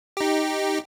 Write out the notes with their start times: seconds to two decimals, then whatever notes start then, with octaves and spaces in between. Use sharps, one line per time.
0.17 D#4 G4